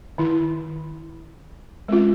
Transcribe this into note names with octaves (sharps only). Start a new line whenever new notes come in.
D#3 E4
G#3 C4 C#4 F4